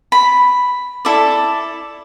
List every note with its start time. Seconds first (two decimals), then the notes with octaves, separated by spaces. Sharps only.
0.12 B5
1.05 E4 A4 D5